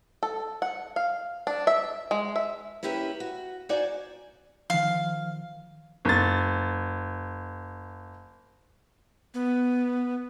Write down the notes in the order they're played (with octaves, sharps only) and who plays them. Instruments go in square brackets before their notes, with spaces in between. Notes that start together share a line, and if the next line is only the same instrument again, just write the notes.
[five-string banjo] A4
F#5
F5
D4
E5
G#3
E5
[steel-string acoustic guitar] A#3 C#4 E4 G4 B4
F#4
D#4 F#4 C5 D5 G5 G#5
[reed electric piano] D#3 F3 [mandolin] F5
[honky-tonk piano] F#1 A6
[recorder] B3